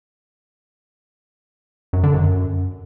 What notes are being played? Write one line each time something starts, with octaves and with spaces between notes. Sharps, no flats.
F#2
D3
F#2